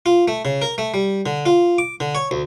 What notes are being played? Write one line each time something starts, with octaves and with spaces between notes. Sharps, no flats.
F4
A3
C#3
A#4
A3
G3
D3
F4
D6
D3
C#5
D2